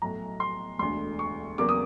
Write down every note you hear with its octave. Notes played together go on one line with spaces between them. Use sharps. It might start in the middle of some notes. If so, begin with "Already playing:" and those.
B1 A2 F#3 A#5
C6
E1 D2 D3 C6
C#6
E2 C#3 F#3 A#3 D6
D#6